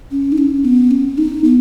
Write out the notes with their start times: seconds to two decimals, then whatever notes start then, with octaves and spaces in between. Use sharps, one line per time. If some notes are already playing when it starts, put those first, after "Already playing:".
0.11 C#4
0.32 D#4
0.38 C#4
0.65 B3
0.91 C#4
1.18 D#4
1.44 B3